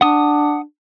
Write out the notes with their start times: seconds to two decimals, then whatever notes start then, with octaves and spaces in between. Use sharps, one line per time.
0.01 D4 F#5 D#6